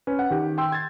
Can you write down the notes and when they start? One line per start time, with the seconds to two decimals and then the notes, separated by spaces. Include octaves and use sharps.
0.07 C#4 B4
0.19 F#5
0.30 D#3 G4
0.58 G5 C6 E6
0.72 G#6 A6